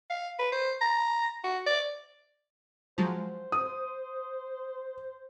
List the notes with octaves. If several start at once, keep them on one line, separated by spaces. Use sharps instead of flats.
F5
B4
C5
A#5
F#4
D5
F3 F#3 G#3 C5
D#6